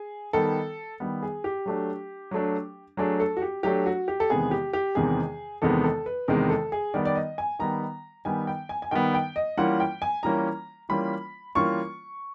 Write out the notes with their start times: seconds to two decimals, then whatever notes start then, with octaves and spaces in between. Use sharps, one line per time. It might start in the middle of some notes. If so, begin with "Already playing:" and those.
Already playing: G#4
0.33 D#3 G3 B3 A4
1.00 D#3 G3 B3
1.23 G#4
1.44 G4
1.66 F#3 A3 D4
2.31 F#3 A3 D4
2.97 F#3 A3 D4 G#4
3.20 A4
3.37 F#4
3.42 G4
3.63 F#3 A3 D4 G4
3.86 F#4
4.08 G4
4.20 A4
4.30 E2 C3 D#3 G#3 B3 G#4
4.51 G4
4.73 G4
4.95 E2 C3 D#3 G#3 B3 G#4
5.62 E2 C3 D#3 G#3 B3 A4
5.84 A4
6.06 B4
6.28 E2 C3 D#3 G#3 B3 A#4
6.50 A4
6.72 G#4
6.94 D#3 G3 B3 D5
7.05 D5
7.15 D#5
7.38 G#5
7.59 D#3 G3 B3 A#5
8.25 D#3 G3 B3 G#5
8.47 G5
8.69 G#5
8.82 G#5
8.91 D#3 G3 B3 G5
9.14 G5
9.36 D#5
9.57 E3 G3 A#3 C#4 F4 F#5
9.80 G5
10.02 G#5
10.23 E3 G3 A#3 C#4 F4 A#5
10.89 E3 G3 A#3 C#4 F4 B5
11.55 E3 G3 A#3 C#4 F4 C#6